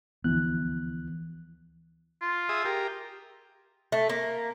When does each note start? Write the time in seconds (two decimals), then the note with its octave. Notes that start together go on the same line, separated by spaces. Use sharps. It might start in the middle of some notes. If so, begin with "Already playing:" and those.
0.24 D2 E3 F3 B3 F#6
2.21 F4
2.49 G#4 E5 D#6
2.65 G4 A#4
3.92 A3
4.09 A#3